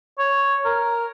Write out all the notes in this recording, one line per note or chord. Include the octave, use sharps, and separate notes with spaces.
C#5
A#4